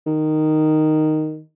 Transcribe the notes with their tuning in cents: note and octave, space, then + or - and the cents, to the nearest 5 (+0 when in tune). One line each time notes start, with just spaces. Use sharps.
D#3 -5